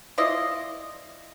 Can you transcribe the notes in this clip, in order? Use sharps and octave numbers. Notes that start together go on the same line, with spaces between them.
E4 F4 D5 D#5